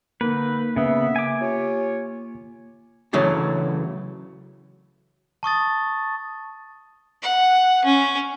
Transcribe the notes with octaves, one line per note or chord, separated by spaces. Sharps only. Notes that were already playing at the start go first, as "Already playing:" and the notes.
D3 A#3 D#4 B4
C#3 B3 E5
G#5 D6
F4 G4 C#5
C#3 E3 F#3 A3 D4
A5 C#6 D#6 A6
F#5
C#4